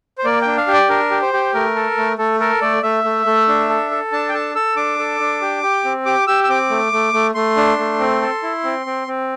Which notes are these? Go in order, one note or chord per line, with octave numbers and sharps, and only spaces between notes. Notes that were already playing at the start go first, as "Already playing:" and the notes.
C5
A#3 D5
D4 G5
F5
G4
D5
D4 A#4
G4
C5
G4
A3 A#4
A4
A3
A3 A4
A4 A#4
A3 D5
A3 E5
A3
A3
D4
A4
A4
D4 A5
G5
A4 A5
A4 E6
D4 D6
A4
D4
G4
G4
C4
G4 D6
G4 E6
E6
C4 D6
A3
A3
A3
A3 C6
D4
A3
C4
A4
E4
C4
C4
C4